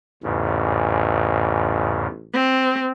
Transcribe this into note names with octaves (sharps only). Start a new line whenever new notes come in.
A1 E2 G#2 C#3
C4